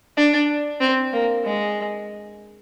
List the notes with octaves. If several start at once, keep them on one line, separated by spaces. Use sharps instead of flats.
D4
C4
A#3
G#3